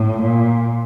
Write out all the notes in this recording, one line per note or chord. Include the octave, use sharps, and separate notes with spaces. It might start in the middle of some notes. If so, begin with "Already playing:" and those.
Already playing: A2
A#2